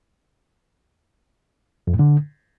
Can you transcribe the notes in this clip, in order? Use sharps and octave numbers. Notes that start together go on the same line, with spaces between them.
F2
A2
D3